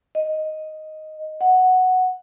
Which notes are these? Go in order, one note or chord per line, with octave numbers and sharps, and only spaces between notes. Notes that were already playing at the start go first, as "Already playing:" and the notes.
D#5
F#5